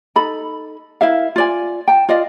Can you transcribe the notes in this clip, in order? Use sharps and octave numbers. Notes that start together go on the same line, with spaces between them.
D#4 A4 B5
E4 A#4 E5 F5
F4 D5 G#5
G5 A5
F4 D5 D#5 F5